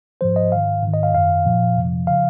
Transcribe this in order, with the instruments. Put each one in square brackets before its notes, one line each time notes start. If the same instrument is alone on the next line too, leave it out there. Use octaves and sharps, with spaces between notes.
[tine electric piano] G#2 F3 C5
D#5
G#2 D#3 F5
G#2 D#3
D#5
F5
F#2 D#3 F5
A#2 F3
F2 C3 F3
C#3 F3 F5